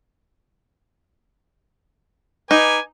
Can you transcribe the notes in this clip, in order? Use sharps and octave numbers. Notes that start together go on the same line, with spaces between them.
D#4 B4 G#5 D6